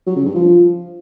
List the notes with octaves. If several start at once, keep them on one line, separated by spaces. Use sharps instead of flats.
F#3
C#3
G2
F3